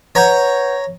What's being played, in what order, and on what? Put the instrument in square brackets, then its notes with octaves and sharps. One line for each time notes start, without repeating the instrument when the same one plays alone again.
[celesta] B4 F#5 G6 [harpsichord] C#5 A#5